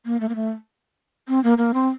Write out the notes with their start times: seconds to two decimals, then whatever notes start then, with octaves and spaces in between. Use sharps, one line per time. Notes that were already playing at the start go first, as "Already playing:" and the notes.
0.05 A#3
0.20 A3
0.29 A#3
0.35 A3
1.28 C4
1.44 A#3
1.58 A#3
1.74 C4